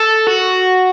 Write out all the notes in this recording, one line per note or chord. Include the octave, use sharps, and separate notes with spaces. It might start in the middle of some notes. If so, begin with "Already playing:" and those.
Already playing: A4
F#4